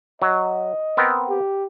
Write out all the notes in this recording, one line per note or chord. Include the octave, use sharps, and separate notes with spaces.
F#3 D#5
B3 C4 A#4
G4